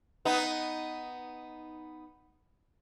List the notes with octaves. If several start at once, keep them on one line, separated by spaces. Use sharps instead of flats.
B3 D#4